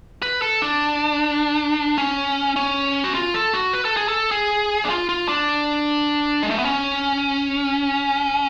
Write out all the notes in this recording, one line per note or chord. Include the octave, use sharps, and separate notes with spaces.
B4
A4
D4
C#4
C#4
F#4
F4
A4
F#4
B4
A4
G#4
A4
G#4
D4
F4
F4
D4
G#3
A3
B3
C#4